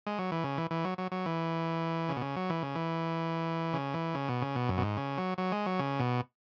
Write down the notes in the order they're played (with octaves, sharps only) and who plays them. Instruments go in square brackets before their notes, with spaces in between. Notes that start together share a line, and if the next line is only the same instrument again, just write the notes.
[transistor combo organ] G#3
F#3
E3
C#3
E3
E3
F#3
F#3
F#3
E3
C#3
B2
C#3
F#3
E3
C#3
E3
C#3
E3
C#3
B2
C#3
B2
F#2
B2
G#2
C#3
F#3
F#3
G#3
F#3
C#3
B2